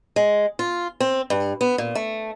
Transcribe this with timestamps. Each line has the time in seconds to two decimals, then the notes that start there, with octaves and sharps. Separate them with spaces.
0.16 G#3
0.59 F4
1.00 C4
1.30 G2
1.61 B3
1.78 A#2
1.95 A3